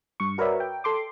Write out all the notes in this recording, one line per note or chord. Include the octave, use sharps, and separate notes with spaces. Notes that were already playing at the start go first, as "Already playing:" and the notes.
G2 C#6
F#4 A#4 B4 C#5 D5 E5
G5
A4 C6 D6